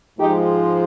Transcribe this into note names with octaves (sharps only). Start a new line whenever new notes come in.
G#2 F3 G#3 D#4 G4